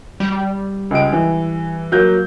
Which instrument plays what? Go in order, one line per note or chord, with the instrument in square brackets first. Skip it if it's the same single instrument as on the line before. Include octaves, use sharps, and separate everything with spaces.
[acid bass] G3
[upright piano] C#2 G#3 D7
E3
F#3 A#3 G6